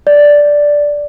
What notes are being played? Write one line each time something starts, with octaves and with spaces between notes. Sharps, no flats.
D5